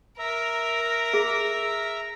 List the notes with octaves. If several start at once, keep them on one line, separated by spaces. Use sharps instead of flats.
A#4 E5 A#5
G#4